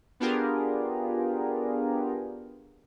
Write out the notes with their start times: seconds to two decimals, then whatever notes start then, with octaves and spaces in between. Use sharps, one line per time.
0.20 B3 D4 F4 G4 G#4 A#4